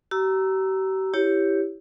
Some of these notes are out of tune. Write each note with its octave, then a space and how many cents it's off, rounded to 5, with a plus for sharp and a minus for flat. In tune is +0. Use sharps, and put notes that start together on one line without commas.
G4 -45 A#5 +0 E6 +0
E4 +0 G4 +0 C#5 +0